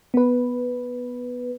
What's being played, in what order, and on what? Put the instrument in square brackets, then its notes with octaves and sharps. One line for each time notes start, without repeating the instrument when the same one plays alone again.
[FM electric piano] B3 B4